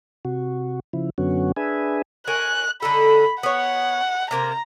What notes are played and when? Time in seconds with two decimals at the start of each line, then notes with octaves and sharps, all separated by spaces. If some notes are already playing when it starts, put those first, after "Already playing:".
0.25 C3 F#4
0.93 C#3 F3 E4
1.18 F#2 D3 F#3 B3 C#4 F#4
1.56 D4 G#4 B4 E5 G#5
2.27 A#4 C#5 G#5 F#6
2.82 D3 D#4 A4 B5
3.43 B3 C#5 F#5
4.31 C3 A#3 C5 A#5